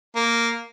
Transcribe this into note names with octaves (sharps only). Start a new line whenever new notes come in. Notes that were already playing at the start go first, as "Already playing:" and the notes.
A#3